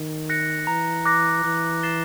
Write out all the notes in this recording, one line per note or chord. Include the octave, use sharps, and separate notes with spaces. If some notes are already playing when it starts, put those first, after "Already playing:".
Already playing: D#3
F#6 A#6 C#7
E3 A#5
D6 F#6 A#6
E3 F#6
A6 C7 E7 G7